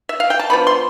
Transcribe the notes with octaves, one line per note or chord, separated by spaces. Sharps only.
E5
F5
G5
A5
F3 B3 D4 B5
C6